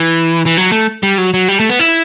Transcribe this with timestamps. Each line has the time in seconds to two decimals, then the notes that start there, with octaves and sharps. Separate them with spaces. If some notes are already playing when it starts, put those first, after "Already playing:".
Already playing: E3
0.46 E3
0.57 F#3
0.72 A3
1.03 G3
1.18 F#3
1.34 F#3
1.48 G3
1.60 A3
1.70 B3
1.79 E4